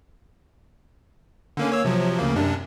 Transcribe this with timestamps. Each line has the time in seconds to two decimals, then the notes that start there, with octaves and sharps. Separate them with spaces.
1.57 D3 A#3 C#4
1.70 A#3 C#5 E6
1.85 C3 F3 F#3
2.19 D2 C#3 A#3
2.36 F#2 C3 D4